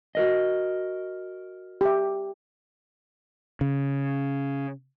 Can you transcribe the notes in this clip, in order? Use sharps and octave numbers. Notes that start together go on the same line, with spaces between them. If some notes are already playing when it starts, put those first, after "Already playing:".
F#4 A#4 D#5
G4 E5
C#3